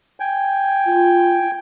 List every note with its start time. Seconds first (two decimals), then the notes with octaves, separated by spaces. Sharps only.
0.20 G5 G#5
0.86 F4